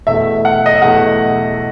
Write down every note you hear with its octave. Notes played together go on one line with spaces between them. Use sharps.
E2 B2 A3 E5
F#5
D#5
E5
E2 B2 A3 F#5